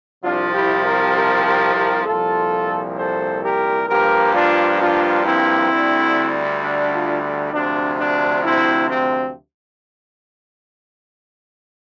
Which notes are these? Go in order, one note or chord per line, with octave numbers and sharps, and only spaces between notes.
C2 C3 F3 D4 F4
E4 G4
G4 A#4
G4 A#4
G4 A#4
G4 A#4
C2 A#2 F3 F4 A4
A4 C5
G4 A#4
G2 F3 A#3 G4 A#4
D4 F4
D4 F4
C4 E4
D2 D3 G3
D4
D4 F4
D2 C3 F3 D4
D4
C4 E4
C4